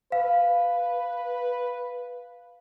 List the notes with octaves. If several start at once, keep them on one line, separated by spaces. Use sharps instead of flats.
B4 F5